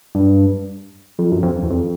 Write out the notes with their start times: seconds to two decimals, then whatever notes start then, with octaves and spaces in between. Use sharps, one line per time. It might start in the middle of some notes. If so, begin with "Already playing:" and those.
0.15 G2
1.19 F2
1.32 F#2
1.43 F2
1.63 E2
1.70 F2